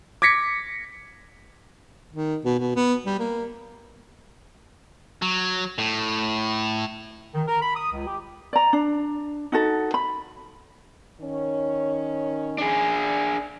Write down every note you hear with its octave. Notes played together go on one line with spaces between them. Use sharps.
D6 G#6 A#6 B6 C#7
D#3
B2
B2
B3
G3
A#3
F#3
A2
D#3
A#4
B5
D#6
C#2
G4
D5 A#5
D4
D#4 F#4 A4
B5
D#3 C#4
D4 G#4